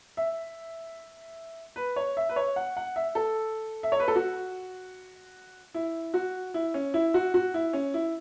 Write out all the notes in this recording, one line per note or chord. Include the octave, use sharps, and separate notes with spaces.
E5
B4
C#5
E5
B4
C#5
F#5
F#5
E5
A4
E5
C#5
B4
A4
F#4
E4
F#4
E4
C#4
E4
F#4
F#4
E4
C#4
E4